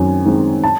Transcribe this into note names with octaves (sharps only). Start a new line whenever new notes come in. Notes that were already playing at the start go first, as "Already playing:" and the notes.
Already playing: F#2 D#3 C4 G#5
D#3 G#3 C4
A5